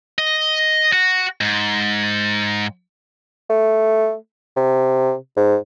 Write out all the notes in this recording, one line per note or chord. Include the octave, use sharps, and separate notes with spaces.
D#5
F#4
G#2
A3
C3
G#2